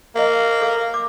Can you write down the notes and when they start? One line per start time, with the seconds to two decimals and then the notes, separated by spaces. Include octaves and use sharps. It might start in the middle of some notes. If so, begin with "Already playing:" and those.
0.16 A#3 D#5 F5
0.61 A4 F5
0.94 D6